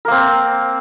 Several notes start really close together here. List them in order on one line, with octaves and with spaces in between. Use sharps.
A#4 A#3 C4